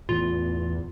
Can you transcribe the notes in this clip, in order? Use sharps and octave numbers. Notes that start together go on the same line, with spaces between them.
E2 A2 E3 F4